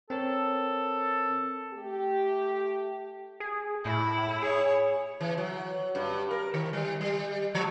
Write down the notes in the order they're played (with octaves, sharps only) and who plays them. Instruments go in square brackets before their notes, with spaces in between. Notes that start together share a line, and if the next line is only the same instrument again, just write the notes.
[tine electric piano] C4 A#4 C#5 [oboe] A4
[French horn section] A3 G4
[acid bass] G#4
[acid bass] A2 [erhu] E4
[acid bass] G#4 [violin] C#5
[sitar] E3
F#3
G2
A#4
D#3
G3
G3
F3